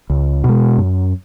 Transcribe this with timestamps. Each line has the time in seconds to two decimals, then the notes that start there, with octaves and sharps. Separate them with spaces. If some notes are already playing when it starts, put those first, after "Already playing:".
0.10 C#2
0.44 B2
0.49 G#3
0.78 F#2